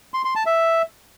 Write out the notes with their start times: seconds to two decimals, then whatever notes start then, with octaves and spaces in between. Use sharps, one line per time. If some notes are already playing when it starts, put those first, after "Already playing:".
0.14 C6
0.25 C6
0.35 A5
0.46 E5